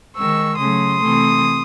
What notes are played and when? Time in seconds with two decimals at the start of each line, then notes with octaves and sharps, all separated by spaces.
0.16 D#3 G#3 C#6 E6
0.58 C#3 F#3 A3 C6 D#6
0.99 C3 E3 A3